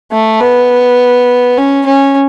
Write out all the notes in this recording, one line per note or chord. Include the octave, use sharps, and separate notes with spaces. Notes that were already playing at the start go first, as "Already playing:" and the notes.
A3
B3
C#4
C#4